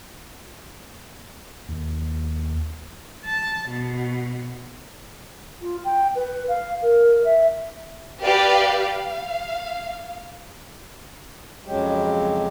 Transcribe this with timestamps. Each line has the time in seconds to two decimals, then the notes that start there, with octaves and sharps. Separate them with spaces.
1.68 D#2
3.26 A5
3.68 B2
5.62 F4
5.84 G5
6.15 B4
6.48 F5
6.82 A#4
7.24 E5
8.23 G4 B4 D5 F5
8.81 F5
11.66 F2 C#3 F#3 G#3 G4